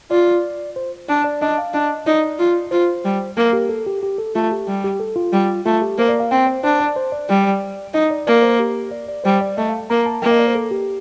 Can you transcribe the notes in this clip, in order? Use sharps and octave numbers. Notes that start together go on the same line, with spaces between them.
F4 D5
C5
D4 D5
D5
D4 D#5
F5
D4 D#5
D#4 D5
F4
F4 C5
G3
A#3 A#4
G4
A4
G4
G4
A4
A3 F4
G4
G3
G4
A4
F4
G3
A3 F4
G4
A#3 C5
D5
F5
C4 G5
C5
D4 C5
D5
C5
D5
G3
D#4 D#5
D5
A#3 D5
C5
G4
D5
D5
G3 C5
D5
A3 D#5
F5
A#3 A#5
A5
A#3 G5
D#5
D5
C5
A4
G4